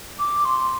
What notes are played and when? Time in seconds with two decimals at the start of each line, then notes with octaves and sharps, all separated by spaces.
0.19 D6
0.45 C6